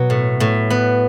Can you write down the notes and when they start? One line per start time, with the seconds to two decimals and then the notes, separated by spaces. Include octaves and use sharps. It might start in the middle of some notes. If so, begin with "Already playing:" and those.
Already playing: B2 F#3 B3
0.10 A2
0.40 A2
0.70 B3